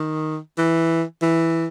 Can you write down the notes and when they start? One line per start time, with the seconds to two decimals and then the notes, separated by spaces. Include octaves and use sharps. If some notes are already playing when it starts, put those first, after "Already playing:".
Already playing: D#3
0.58 E3
1.22 E3